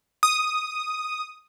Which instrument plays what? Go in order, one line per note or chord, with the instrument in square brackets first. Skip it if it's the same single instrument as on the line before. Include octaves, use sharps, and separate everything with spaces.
[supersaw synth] D#6